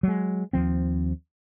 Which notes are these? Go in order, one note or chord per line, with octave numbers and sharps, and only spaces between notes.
F#3 G#3
D#2 F3 C4